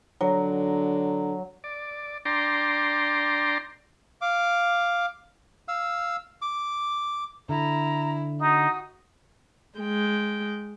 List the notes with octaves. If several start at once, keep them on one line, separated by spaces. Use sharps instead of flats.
D3 F#3
D5
D4 D5 G5 A#5 C6
F5 D6
F5 E6
D6
D3 E4 A#5
D#4 F#4 D#6
G#3 G5